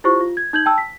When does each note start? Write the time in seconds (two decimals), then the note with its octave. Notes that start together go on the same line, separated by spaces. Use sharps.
0.04 E4 F4 G4 C5 C#6
0.21 F4
0.37 G#6
0.53 D#4 G6 G#6 F#7
0.66 G5 A5 E6
0.78 B6